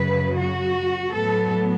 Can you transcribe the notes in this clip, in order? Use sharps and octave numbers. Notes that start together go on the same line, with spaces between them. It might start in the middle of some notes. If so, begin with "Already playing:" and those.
Already playing: F#2 C#3 F#3 B4
F#4
A2 F#3 B3 A4